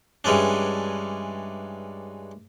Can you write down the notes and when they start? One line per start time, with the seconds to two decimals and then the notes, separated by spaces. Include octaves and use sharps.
0.24 G2 E3 G#3 C#4 D4